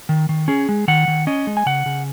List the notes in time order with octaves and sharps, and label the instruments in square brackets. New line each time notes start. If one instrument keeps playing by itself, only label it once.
[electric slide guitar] D#3
D#3
C#4 G#4
G#3
D#3 F#5
D#3
C#4 D#5
G#3
G#5
C#3 F#5
C#3